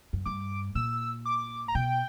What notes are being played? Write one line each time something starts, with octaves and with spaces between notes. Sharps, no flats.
F#2
G2 D6
A#2 E6
D6
A#5
B2 G5